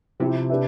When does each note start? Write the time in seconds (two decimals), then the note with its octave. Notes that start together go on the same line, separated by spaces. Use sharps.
0.20 C3 F3 C4 E4 G4
0.50 D4 G4 B4 E5